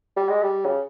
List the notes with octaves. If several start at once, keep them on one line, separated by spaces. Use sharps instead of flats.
G3
G#3
G3
C#3